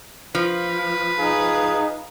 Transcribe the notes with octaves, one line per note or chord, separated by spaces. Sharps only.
F3 B4
D#4 G#4 F5